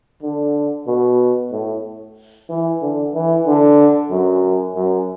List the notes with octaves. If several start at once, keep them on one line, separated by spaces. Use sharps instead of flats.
D3
B2
A2
E3
D3
E3
D3
F#2
F#2